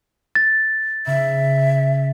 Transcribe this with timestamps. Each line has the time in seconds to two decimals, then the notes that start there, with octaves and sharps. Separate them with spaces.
0.35 A6
1.07 C#3 E5